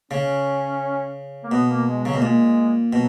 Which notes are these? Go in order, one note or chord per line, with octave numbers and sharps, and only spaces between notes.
C#3 C#4
A#3
B2 B3
A#3
G#3
C#3 F#3
B2 A#3
A#2 G#3
B2 F#3